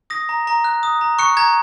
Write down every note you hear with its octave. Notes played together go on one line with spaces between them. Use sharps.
D#6 A#6
A#5
A#5
F#6
D#6
A#5
C#6 F#6 C#7
A#5 G#6